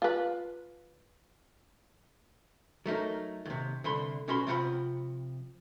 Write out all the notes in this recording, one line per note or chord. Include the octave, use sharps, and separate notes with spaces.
F4 B4
F#3 A3 D#4 A#4
D#2 C3
C2 D3 B5 C6
B1 C#4 F#4 B5 C6
C3 F3 C4 F#5 A#5 B5